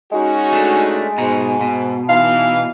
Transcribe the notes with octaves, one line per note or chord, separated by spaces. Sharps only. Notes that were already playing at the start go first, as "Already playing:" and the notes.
G#3 C#4 D#4 F#4
A3 D4
G#2 B2 D#4
B2
E3 D#4 F5